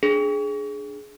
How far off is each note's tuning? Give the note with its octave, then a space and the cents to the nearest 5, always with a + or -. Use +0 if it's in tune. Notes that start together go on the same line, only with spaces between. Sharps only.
D4 +0 G#4 +10